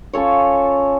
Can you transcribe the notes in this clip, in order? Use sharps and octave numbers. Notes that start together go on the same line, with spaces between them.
C#4 F4 A4 C#5